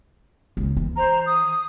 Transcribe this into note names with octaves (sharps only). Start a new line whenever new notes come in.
C#2
E3
C5 A#5
D#6